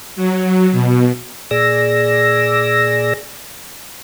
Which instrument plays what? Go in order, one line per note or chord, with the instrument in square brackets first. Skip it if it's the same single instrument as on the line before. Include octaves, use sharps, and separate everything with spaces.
[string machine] F#3
B2
[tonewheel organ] A#2 G#4 D5 E6 A#6